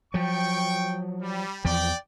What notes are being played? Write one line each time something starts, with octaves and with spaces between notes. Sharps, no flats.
F3 F#3 G5 C#6
G3
E2 F3 D5 G5